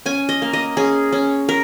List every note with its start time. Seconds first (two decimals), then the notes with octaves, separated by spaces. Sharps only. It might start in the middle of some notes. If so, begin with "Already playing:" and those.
0.06 C#4 G#5
0.29 D#5
0.42 A#3
0.53 D#5
0.77 C#4 G#4
1.13 C#4
1.49 A#4